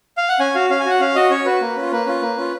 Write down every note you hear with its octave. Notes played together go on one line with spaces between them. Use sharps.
F5
F#5
C#4 G#5
F#4 F5
C#4 F5
G#5
F#4 F#5
C#4 F5
F#4 D#5
C#4 C#5
F#4 B4
A#3
C#4 F4
A#3 B4
C#4 F4
A#3
C#4 F4